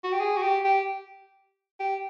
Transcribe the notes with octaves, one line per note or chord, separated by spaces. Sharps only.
F#4
G4
G#4
F#4
G4
G4
G4